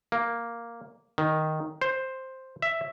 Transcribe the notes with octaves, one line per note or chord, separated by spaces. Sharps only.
A#3
D#3
C5
E5